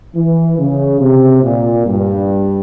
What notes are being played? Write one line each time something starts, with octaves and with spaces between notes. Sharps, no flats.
E3
C#3
C3
A#2
G2